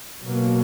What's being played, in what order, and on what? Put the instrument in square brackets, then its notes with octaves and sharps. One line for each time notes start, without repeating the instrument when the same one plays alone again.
[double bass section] B2 F#3 A#3